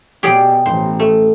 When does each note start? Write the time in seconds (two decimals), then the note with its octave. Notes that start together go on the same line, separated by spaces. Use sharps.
0.23 B2 G4 G#4 D5
0.66 A1 C5
1.00 A3